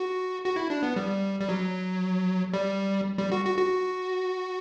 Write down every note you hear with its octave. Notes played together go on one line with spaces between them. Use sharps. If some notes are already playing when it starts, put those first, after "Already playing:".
Already playing: F#4
F#4
E4
D4
B3
G3
G3
F#3
G3
G3
F#4
F#4
F#4